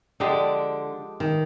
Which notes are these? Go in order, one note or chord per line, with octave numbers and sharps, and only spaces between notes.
D3 F3 G#3 D4 G4
D#3